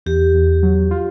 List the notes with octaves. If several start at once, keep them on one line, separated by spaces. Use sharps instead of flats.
E2 G4
E2
F#3
F4